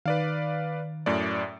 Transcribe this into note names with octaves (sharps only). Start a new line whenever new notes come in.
D#3 B4 D5 F5
F#2 A2 D5